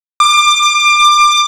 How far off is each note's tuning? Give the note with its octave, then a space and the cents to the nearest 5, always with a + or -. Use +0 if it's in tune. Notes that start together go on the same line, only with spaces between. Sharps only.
D6 +25